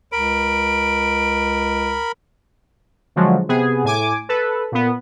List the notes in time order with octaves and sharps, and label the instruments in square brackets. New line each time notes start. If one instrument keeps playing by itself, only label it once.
[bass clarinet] C#2 [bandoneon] A#4 B5 [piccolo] D7
[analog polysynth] D3 F3 F#3 G#3
C3 B3 G#4
A2 G#5 D6
A4 B4
A#2 B3